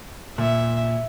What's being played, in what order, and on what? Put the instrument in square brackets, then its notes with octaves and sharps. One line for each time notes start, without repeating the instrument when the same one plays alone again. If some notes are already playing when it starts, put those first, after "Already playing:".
[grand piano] A#2 [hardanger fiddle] E5